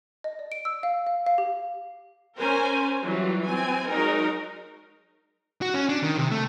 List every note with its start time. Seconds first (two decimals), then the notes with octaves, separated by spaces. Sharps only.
0.24 D#5
0.39 D5
0.52 D7
0.65 E6
0.83 F5
1.07 F5
1.27 F5
1.38 G4
2.39 C#4 A#4 C5 G#5
3.01 E3 F#3 G3 F4
3.45 C4 G#5
3.89 F#3 G#3 D#4 A#4
5.62 F#4
5.74 C#4
5.89 D4
6.03 D#3
6.17 C3
6.31 A3